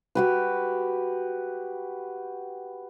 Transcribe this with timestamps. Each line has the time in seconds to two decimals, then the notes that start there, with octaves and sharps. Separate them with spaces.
0.15 F#4 G4 B4